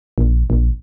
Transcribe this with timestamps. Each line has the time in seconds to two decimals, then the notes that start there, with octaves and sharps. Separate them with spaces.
0.18 A#1
0.50 A#1